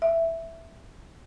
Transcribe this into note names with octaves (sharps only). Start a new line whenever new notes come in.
E5